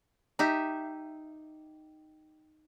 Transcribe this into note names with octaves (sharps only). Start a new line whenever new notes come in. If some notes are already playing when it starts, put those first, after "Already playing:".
D#4 G4 E5